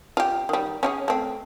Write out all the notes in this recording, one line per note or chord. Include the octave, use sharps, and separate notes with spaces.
F4 G4
D#3 G3
C#4 G4 G#4
A3 C4